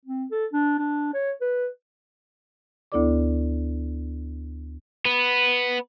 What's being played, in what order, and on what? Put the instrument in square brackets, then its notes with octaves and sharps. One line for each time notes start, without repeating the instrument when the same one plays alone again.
[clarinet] C4
A4
D4
D4
C#5
B4
[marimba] D2 B3 E4 A4 D5 D6
[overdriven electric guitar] B3